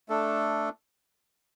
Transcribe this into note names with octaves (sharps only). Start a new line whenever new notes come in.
A3 D4 A4